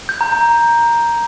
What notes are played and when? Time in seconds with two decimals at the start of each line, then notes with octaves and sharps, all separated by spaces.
0.09 G6
0.21 A#5
0.32 A#5